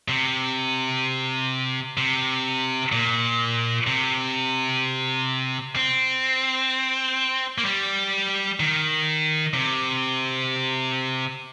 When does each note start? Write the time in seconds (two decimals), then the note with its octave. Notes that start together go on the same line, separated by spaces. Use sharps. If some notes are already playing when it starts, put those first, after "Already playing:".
0.08 C3
1.98 C3
2.92 A#2
3.87 C3
5.76 C4
7.58 A#3
7.65 G3
8.60 D#3
9.54 C3